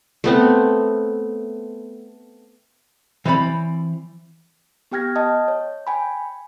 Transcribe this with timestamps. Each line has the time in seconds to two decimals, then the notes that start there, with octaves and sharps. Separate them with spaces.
0.24 A3 B3 C4
3.26 E3 C4 C#5 D5 B5
4.91 B3 G4 G5 F6 G#6 A#6
5.15 D#5 G5 A5 D#6
5.48 C#5
5.87 G5 G#5 B5